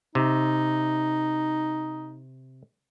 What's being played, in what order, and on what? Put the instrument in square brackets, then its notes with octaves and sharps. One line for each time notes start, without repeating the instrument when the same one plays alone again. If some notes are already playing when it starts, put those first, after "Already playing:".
[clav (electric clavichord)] C3 [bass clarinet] D#4